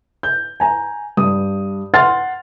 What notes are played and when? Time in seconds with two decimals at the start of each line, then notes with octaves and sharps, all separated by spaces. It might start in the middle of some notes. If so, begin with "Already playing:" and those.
0.23 G6
0.60 G#5 A#5
1.17 G2 D#6
1.94 F#5 C6 F6 A6